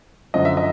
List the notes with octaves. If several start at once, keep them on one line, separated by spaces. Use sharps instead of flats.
F#2 D3 F3 D#5
E5
D#5